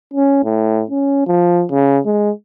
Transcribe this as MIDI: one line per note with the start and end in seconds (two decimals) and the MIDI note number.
0.14 0.40 61
0.44 0.82 45
0.90 1.22 61
1.27 1.65 53
1.71 1.99 49
2.05 2.31 56